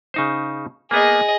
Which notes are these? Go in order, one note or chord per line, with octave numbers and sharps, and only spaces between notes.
C#3 D#4 C5
A#3 B3 G#4 D#5